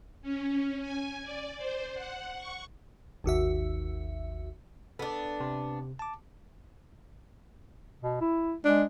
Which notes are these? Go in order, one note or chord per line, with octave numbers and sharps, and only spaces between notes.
C#4
G#5
D5
C5
F#5
C#6
G#1 D#2 F#4 E5
B3 D4 A4
C3
A5 D6
B2
E4
G#3 D4